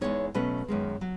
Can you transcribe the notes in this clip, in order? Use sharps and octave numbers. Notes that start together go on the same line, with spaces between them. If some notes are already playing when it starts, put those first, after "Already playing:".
E2 B2 G#3 B3 D#4 C#5
B2 F#3 A3 C#4 B4
F#2 D#3 G#3
F#3